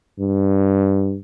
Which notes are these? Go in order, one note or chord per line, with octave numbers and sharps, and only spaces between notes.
G2